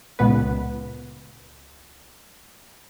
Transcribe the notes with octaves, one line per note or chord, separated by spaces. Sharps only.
C#2 A#2 B3 B4